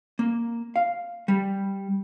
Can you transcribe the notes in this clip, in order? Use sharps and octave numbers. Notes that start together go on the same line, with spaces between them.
A#3
F5
G3